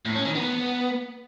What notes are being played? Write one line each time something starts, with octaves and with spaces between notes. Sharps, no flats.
A2
C#4
D#3
B3